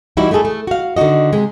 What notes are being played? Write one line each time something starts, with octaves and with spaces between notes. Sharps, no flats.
E3 G3 D#4 E4 F#4
A3 D#4 E4 G#4 A4
A3
F#4 F5
D3 D#3 D#4 F#4 D#5
C3 G#3